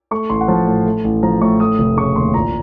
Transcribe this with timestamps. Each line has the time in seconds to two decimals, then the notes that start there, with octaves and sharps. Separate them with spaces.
0.11 A3 C#6
0.30 A1 C6
0.41 F#5
0.48 F3 A5
0.67 A2
0.86 A3
1.04 A1
1.23 F3 A#5
1.41 A2 C#6
1.60 A3 D#6
1.79 F1
1.97 C#3 C#6
2.16 D#2 C6
2.34 A#1 A#5